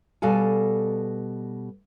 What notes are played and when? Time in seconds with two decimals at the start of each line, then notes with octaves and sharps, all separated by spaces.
0.22 B2 G3 A4 F5 G#5